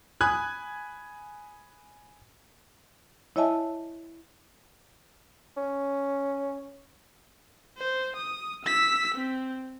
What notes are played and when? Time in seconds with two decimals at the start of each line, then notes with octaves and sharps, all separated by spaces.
0.21 G#5 B5 D#6 F#6 G#6
3.36 E4 C#5 D#5 E5 G#5 A5
5.57 C#4
7.78 C5
8.16 D#6
8.65 E6 B6
9.14 C4